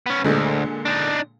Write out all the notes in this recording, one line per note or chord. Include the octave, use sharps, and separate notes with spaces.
B3 C#4
D2 A#2 D3 G#3
D4 D#4